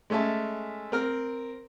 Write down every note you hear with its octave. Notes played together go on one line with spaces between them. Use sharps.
G#3 A3 C#4 E5 A5
C4 A#4 F6